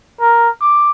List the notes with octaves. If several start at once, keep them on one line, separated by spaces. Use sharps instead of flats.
A#4
D6